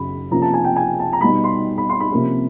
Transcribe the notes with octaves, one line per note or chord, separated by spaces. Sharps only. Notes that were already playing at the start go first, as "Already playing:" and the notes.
Already playing: F#2 C#3 B5
C3 F3 A#3 C#4 A#5
A5
G#5
G5
G#5
A5
A#5
B2 G3 B3 D#4 B5
C6
B5
C6
B5
C3 F3 A#3 C#4